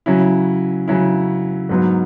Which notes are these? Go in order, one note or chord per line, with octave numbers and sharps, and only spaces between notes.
C#3 F#3 C#4 E4
C#3 F#3 C#4 E4
G#2 F#3 B3